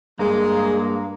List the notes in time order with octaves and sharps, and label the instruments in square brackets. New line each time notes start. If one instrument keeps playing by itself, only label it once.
[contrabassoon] G2 [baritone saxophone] G#3 [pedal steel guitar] A#3 [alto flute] G#4